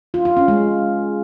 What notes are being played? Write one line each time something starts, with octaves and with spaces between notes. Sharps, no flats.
F4
F4
C#4
G#3